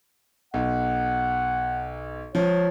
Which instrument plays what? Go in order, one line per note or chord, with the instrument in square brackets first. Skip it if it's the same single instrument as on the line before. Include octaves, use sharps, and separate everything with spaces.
[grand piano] B1 [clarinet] F#5
[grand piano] F3 [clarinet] C#5